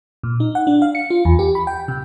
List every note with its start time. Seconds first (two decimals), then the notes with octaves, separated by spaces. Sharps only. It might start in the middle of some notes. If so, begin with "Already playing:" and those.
0.23 A#2
0.40 D#4
0.55 F#5
0.67 D4
0.82 F5
0.95 C#7
1.10 F4
1.25 E2
1.39 G4
1.55 B5
1.67 G5
1.88 C3